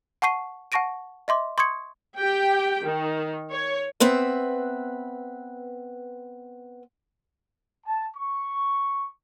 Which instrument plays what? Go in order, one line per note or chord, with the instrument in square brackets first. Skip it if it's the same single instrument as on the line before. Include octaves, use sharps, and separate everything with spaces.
[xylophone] F#5 A5 C#6 C7 D#7
F#5 A5 C#6 A#6 D7 D#7
D#5 E5 C6 D6
C6 C#6 D#6 G#6 C#7
[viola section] G4 G5
D#3
C#5
[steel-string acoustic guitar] B3 C4 B4 E5
[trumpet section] A5
C#6